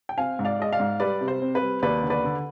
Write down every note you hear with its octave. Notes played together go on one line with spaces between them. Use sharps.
G5
C4 F5 G#5
G#2
D5 F5
G#3 D#5
D5 F5
G#2
G3 B4 D5
C3
C5
C4
B4
G3
D#2 B4 D5
D3
B4 D5
D3